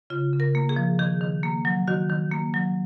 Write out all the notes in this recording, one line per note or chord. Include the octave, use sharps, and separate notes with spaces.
C#3 F4
C#3
A#4
A#3
G#4
F3
D#3 G#4
D#3
A#3
F#3
D#3 F#4
D#3
A#3
F#3